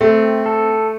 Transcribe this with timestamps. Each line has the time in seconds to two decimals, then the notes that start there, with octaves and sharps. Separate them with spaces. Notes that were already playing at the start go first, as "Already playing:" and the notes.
0.01 A3 C4
0.46 A4